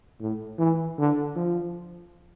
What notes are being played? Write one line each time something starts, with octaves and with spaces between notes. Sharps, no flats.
A2
E3
D3
F3